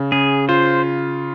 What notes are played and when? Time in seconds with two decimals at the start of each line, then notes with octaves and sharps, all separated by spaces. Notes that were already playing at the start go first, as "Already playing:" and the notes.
Already playing: C#3
0.12 C#3 G#4
0.49 F4 C5